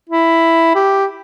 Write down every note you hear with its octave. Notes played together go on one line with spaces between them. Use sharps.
E4
G4